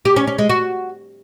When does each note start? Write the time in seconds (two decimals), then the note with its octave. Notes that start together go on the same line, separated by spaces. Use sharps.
0.05 G4
0.16 C#4
0.27 C#4
0.38 G#3
0.49 F#4